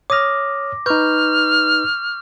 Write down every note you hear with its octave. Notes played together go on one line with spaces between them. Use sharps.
C#5 D6 D#6 F6 A#6
D#4 B4 C#6 F6 G6